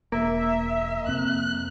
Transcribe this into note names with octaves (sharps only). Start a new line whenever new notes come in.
E1 A#3 E5
F2 C3 C4 F#6